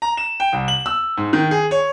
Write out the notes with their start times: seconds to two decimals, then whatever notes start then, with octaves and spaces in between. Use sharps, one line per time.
0.02 A#5
0.17 E7
0.40 G5
0.53 C2
0.68 F#7
0.86 E6
1.17 G#2
1.33 D#3
1.51 G#4
1.71 C#5